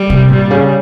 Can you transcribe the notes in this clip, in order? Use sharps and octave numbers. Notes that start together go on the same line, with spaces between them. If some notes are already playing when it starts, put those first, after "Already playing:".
Already playing: G3
C3
A#2 G3
C#3